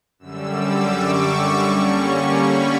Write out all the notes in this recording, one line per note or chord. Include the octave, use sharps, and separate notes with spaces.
F#2 D3 G3 E6
D6
C#6
D3 G3 A#3 C#4
B5